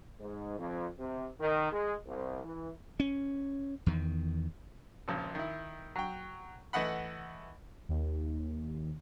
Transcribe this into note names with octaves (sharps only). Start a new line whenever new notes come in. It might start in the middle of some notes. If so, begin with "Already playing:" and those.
G#2
F2
C3
D#3
G#3
C2
E3
C#4
E2 D#3
G#1 C#2 A#2 F3
D#3 E4
F#3 G5
E3 A3 D#5 F#5 B5
D#2